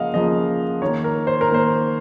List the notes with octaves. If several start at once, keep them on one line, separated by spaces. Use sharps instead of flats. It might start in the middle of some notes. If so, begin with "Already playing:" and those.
Already playing: C#3 F3 A#3 D#5 F5 F#5
C#3 F3 A#3 D#5
D#3 A#3 C#5
A#4
C5
A#4
D#3 A#3 C5